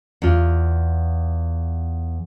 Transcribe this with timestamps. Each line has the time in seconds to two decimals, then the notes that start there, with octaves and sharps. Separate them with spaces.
0.22 E2 F4